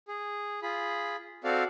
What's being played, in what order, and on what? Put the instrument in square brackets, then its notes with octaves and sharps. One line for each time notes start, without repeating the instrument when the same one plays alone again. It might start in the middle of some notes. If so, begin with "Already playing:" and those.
[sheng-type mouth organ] G#4
F4 G#4 B5
C4 F#4 A4 D5 F5